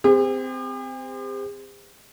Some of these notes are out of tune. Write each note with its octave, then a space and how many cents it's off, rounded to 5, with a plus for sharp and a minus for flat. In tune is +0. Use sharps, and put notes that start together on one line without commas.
C4 -20 G4 +45